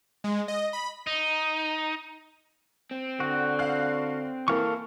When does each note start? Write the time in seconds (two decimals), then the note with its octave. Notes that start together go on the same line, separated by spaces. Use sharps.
0.24 G#3
0.48 D#5
0.73 B5
1.07 D#4
2.91 C4
3.20 D3 F#4
3.59 F5 F#6
4.48 E3 A#3 A4 F5 C#6